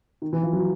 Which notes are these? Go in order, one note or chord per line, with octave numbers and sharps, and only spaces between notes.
D#3
E3
F3
F#3